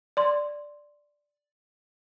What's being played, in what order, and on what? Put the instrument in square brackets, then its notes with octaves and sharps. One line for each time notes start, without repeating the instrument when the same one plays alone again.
[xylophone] D5 C6